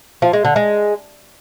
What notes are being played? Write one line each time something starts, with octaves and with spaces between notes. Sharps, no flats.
F3
G#3
D3
G#3